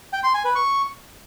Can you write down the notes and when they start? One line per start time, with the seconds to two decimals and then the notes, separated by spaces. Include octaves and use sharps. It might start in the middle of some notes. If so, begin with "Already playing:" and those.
0.13 G5
0.24 C6
0.34 G#5
0.45 B4
0.55 C#6